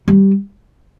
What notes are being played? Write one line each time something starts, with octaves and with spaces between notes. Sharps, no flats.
G3